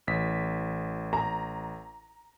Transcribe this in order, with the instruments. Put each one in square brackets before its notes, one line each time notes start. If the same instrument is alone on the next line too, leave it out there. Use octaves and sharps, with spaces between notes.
[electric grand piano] A1 B6
[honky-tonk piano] A#5